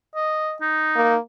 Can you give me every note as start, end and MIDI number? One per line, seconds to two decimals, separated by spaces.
0.15 0.55 75
0.61 1.13 63
0.96 1.18 58